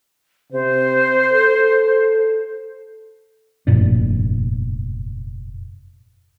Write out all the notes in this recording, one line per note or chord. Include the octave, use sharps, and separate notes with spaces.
C3 C5
A4
F1 G2 A#2 D4